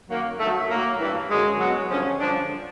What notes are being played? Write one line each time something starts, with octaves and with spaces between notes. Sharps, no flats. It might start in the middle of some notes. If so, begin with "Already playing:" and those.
F#2 D#3 F#3 A#3
G2 D#3 F#3 A3
A2 F#3 A#3
G2 E3
F#2 D3 F#3 G#3
B2 F#3
G2 D3 F3 C#4
G2 D3 F3 D4